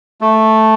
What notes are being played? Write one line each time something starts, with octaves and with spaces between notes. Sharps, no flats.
A3